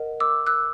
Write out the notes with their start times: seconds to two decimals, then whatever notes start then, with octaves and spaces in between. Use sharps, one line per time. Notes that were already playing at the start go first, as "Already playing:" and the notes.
Already playing: A#4 D#5 F#5
0.20 D6 E6
0.47 E6 F#6